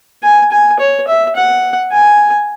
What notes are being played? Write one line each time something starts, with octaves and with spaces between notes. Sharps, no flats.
G#5
G#5
C#5
E5
F#5
G#5